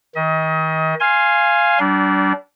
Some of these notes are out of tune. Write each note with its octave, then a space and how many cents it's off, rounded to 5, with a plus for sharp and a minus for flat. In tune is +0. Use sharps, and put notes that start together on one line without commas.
D#3 +35 D#5 +30
F5 -10 G#5 +0 C6 +20
G3 -40 D4 -20